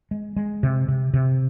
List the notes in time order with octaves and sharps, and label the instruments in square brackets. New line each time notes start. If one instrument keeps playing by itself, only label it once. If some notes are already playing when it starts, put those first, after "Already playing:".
[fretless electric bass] G#3
G#3
C3
C3
C3